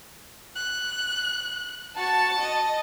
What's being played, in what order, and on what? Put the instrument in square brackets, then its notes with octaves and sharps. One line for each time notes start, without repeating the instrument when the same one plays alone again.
[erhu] F#6
[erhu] F#4 [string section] A5
[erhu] D#5